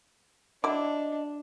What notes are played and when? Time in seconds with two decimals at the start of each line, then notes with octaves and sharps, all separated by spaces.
0.64 F#3 D4 E4 D#5 D6